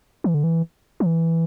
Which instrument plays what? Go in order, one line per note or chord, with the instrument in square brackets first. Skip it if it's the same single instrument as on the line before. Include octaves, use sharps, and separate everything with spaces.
[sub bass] E3
D3
E3
F3
E3